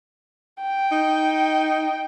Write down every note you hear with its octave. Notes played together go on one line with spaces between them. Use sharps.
G5
D#4